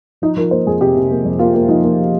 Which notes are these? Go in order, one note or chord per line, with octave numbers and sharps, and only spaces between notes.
F3 D#4
F3 A#4
A#3 C5
F2 G#4
C3 G4
C3
A#3
F2
A#3 F4
A#3
F3 D#4
A#3